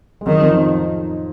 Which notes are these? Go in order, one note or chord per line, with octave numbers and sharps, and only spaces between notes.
G#3
F#2 D#3 F#3
F2 F3
D#3
F3